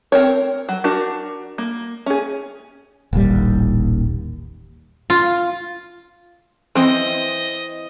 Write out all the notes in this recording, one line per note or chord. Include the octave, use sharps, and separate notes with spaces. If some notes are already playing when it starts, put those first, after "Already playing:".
C4 A#4 C#5
F#3
D4 F#4 A#4
A#3
C#4 G#4
D#1 A1 D#2 G3
F4
E3 C4 D#5